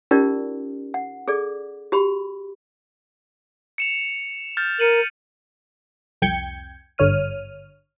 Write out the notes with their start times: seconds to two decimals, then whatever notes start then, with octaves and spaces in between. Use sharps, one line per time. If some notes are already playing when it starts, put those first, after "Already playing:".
0.11 C#4 D#4 F4 G4 A#4 D5
0.94 F#5
1.28 G#4 A4 D5
1.92 F#4 G4 B5
3.78 C#7 E7 F7
4.57 F6 G6 A6
4.80 A#4 C#7 D#7 F#7
6.22 C2 F2 G5 G6 G#6 C#7
6.98 G#1 G2 D3 C#5 F6 D#7